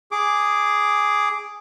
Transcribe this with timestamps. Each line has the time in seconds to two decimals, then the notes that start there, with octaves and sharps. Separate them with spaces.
0.12 G#4 D6